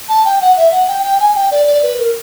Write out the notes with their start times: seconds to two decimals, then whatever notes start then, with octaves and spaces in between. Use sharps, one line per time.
0.09 A5
0.25 G5
0.41 F#5
0.57 E5
0.72 F#5
0.88 G5
1.04 G5
1.20 G#5
1.35 G5
1.51 D5
1.67 D5
1.83 B4
1.99 A#4